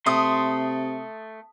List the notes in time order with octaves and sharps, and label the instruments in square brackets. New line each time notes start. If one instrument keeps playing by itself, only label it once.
[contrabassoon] C3 [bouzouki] A3 [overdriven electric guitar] C6 [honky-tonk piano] D#6